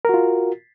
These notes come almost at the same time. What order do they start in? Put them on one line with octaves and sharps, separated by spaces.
A#4 F#4 F4